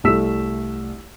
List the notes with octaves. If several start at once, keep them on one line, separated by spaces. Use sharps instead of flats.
C2 A3 E6 B6 E7